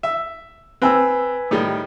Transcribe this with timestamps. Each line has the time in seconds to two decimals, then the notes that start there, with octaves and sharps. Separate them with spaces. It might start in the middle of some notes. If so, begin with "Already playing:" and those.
0.03 E5
0.82 C4 B4 G#5 E6
1.51 A2 D#3 G3